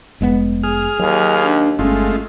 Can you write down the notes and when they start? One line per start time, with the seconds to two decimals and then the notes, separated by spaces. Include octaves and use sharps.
0.21 F1 G#3 B3
0.63 G#4 F6
0.99 D#2 F#3
1.44 D4
1.79 G1 G#3 A3 C#4 F4